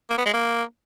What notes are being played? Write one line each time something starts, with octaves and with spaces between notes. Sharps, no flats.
A#3
B3
G#3
A#3